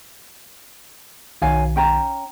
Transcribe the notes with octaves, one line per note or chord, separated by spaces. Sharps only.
B1 D#3 C#5 F5 G#5
C#4 G5 A#5